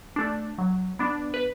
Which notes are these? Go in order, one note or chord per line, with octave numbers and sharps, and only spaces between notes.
A3 D4
F#3
B3 D4
B4